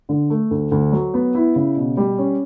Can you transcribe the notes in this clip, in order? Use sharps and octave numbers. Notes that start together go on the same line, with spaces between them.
D3
A3
D2
D2
F#3
B3
E4
C#3
B2
G3
C#4